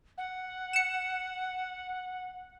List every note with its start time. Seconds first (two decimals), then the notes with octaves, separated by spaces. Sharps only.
0.18 F#5
0.73 C#7 E7